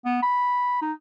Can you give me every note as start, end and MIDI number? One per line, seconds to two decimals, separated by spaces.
0.05 0.19 59
0.22 0.77 83
0.82 0.92 63